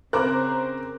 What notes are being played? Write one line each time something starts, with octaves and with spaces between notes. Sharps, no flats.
C#3 C4 A#4 C5 A#5 D6 F#6